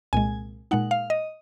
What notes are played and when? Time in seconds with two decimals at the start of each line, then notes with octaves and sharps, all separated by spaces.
0.13 C2 A#2 G#3 G#5
0.71 A#2 G#3 D#4 F#5
0.91 F5
1.10 D#5